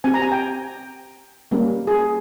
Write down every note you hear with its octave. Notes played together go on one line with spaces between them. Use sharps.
C4 G4 G#5
A#5
G#5
G5
G3 A#3 C#4 G4
G#4